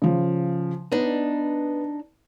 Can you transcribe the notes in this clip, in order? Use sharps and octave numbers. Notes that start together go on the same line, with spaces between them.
C#3 F3
B3 D4 D#4